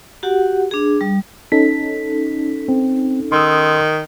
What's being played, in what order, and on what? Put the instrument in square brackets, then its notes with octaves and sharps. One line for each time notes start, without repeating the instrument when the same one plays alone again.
[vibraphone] F#4 G4 F#5
D4 G#4
G3
[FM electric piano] C#4 D#4 A4 [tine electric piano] B6
[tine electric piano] C4
[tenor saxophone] D#3 [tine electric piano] C6 D#6 E6